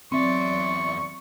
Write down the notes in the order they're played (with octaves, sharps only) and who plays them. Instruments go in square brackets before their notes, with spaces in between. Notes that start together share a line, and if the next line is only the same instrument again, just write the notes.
[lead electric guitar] E2 E5 [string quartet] F#3 D5 C6 [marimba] C4 [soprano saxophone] C#6